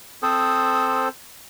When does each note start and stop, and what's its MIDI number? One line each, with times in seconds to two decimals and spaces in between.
0.23 1.09 60
0.23 1.09 69
0.23 1.09 72
0.23 1.05 87